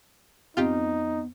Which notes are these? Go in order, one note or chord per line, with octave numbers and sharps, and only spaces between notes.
F2 B3 D#4 F4 G4